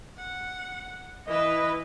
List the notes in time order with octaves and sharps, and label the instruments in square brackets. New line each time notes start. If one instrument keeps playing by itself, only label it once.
[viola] F#5
[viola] E3 B4 [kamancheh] D#5